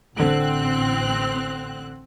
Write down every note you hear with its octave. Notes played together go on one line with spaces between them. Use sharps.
A1 D3 C4 F#6 D7